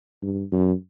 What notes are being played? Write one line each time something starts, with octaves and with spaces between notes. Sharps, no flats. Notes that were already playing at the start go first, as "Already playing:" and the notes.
G2
F#2